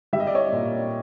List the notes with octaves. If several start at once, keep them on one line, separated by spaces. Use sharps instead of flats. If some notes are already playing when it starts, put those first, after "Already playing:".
G3 E5
D#5
D5
C#5 D#5
A#2